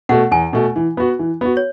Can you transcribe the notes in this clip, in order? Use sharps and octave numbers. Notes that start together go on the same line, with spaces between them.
B2 A3 F#5
E2 G#5
B2 A3
E3
B3 F#4
E3
B3 F#4
C#5